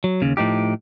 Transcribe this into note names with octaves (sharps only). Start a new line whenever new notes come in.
F#3
D#2 C#3
A2 F3 D#4 G4